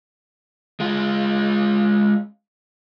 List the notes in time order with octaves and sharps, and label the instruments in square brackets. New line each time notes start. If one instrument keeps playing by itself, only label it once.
[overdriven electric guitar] G#3 F4